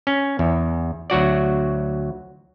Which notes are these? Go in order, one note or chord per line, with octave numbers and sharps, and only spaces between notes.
C#4
E2
D2 F#3 F#4 D5